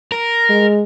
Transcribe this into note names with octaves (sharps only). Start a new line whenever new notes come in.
A#4
G#3